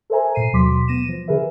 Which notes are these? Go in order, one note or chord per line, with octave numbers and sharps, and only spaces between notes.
A4 A#4 C5 E5 G#5 A#5
A#2 C7 D#7
D#2 B2 F#3 C6 D6 B6
B3 A#6 D#7 E7
F3
D3 G#4 A#4 B4 E5